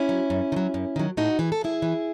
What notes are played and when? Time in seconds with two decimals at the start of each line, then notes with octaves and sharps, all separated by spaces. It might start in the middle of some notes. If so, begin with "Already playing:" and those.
Already playing: C#4 E4
0.09 F#3
0.30 F#2
0.52 D#3
0.56 F#3
0.74 F#2
0.96 D#3 F#3
1.17 A2 D#4 F#4
1.39 E3 G#4
1.52 A4
1.61 A2 E4 G#4
1.82 E3